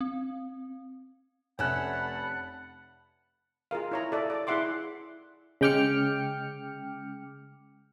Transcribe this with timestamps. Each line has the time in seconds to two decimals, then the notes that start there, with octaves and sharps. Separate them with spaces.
0.01 C4
1.59 F1 A3 C#4 F#5 A5 B5 F#6
3.71 F4 G#4 A#4 F5
3.91 E4 C#5 A#5
4.12 A4 D5 E5
4.30 D5 D6
4.47 E4 G#4 E5 F#5 C6 D6
5.61 C#3 G#3 G5 D6 F6 C#7